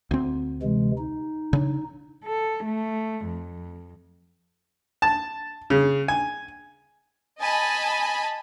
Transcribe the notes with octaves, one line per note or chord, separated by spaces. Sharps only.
D2 C4
C3 E3 G#3
D#4
C#3 D4
A4
A3
F2
A5
C#3
G#5
D#5 G#5 A5 B5